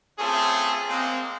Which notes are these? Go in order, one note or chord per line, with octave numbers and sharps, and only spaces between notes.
A3 C4 C#4 F4 G#4 A4
G#3 A#3 C4